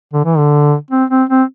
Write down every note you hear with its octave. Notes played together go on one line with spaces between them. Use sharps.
D3
E3
D3
C4
C4
C4